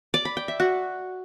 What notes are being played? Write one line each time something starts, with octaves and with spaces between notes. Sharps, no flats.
D5
B5
G5
E5
F#4